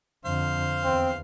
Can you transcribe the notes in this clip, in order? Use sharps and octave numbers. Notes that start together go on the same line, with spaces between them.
F2 D3 C5 F5
E2 C4